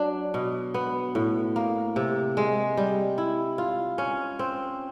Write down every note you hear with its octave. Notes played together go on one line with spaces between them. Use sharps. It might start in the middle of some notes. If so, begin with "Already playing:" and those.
Already playing: F#3 D4
B2
B3
A2
A#3
C3
G#3
G3
E4
F4
C#4
C4